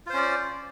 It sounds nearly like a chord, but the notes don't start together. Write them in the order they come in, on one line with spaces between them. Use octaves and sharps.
F4 C5 C#4 D5